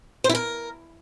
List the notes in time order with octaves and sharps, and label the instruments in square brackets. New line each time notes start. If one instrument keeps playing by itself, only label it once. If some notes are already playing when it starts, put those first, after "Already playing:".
[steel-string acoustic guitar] C5
E4
A#4